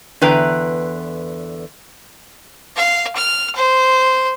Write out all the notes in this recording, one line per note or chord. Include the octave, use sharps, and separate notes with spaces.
E2 D3 B4 G5 A#5
F5
F6
C5